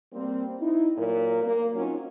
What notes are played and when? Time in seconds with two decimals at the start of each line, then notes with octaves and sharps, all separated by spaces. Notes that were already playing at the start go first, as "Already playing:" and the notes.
0.13 G3 A#3 C4
0.60 D#4 E4
0.98 A#2 F#3 A#4
1.43 A#3
1.75 F#3 C4 C#4 D#4 F4